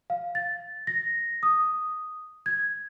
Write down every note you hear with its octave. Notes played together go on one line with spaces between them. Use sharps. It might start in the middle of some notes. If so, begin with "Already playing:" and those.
F5
A6
A#6
D#6
G#6